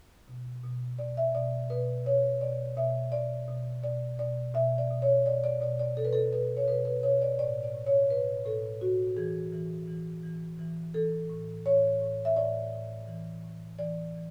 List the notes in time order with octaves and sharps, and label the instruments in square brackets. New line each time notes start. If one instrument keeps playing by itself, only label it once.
[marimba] B2
B2
B2 D5
E5
B2 D5
B2 B4
B2 C#5
B2 D5
B2 E5
B2 D5
B2
B2 D5
B2 D5
B2 E5
D5
B2
C#5
B2 D5
D5
B2 D5
D5
B2 A4
B4
A4
B2 B4
C#5
B2 B4
B4
B2 C#5
D5
A2 D5
D5
A2
C#5
A2 B4
A2 A4
A2 F#4
E3 G#4
E3
E3
E3
E3
E3 A4
A2
A2 C#5
A2
E5
A2 D5
A2
E3
A2
E3 D5
E3